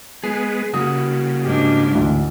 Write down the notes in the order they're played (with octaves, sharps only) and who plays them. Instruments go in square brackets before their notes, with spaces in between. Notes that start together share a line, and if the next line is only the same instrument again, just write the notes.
[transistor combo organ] G#3 B3 [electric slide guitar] G#4
[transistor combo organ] C#3 [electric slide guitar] G3 A#3 F#4 [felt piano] D#6
[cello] G#2 D4 [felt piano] G4
[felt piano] A1 D2